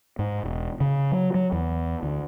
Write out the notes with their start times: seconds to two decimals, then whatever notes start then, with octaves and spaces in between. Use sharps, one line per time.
0.19 G#2
0.43 E1
0.81 C#3
1.12 F#3
1.34 F#3
1.52 E2
2.03 D2